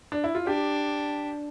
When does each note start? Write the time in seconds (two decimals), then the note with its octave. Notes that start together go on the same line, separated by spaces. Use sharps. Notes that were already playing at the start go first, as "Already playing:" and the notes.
0.12 D4
0.24 E4
0.35 F4
0.46 D4 G4